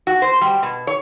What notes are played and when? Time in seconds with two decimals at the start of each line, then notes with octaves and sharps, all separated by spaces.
0.07 F#4
0.22 C5
0.41 G3
0.63 B2
0.87 C#5